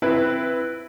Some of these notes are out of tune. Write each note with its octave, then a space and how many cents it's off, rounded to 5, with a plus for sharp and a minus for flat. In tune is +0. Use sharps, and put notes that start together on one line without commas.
C4 +0 E4 +10 B4 +0